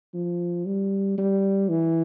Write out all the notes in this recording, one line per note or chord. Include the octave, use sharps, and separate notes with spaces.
F3
G3
G3
E3